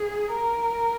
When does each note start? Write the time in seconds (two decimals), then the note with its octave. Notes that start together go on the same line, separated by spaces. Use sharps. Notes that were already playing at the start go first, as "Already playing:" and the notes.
Already playing: G#4
0.32 A#4